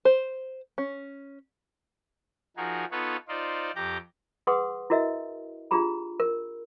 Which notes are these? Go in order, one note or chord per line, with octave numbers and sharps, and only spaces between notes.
C5
C#4
F3 D#4 F#4 G#4 A#4
B3 D#4 F4 A4 B4 C#5
D#4 F4 C5 D5
F2 G4 A#5 D6 G6
G#4 B4 F#5 C6 D#6
E4 F#4 A#4 D#5 E5
D4 F4 G4 G#4 A#5 B5
A#4